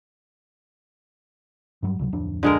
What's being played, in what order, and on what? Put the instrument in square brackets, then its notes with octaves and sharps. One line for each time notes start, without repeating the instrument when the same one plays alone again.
[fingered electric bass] G2 F#3 G3
C#2 C3 F#3
D1 F2 D4
[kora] D3 G#3 A#4